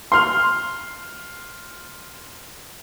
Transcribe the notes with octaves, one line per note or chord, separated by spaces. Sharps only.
C6 F6